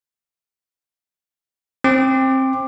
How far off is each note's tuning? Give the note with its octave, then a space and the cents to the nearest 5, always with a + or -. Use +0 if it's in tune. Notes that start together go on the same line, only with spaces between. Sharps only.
C4 +20 D6 +15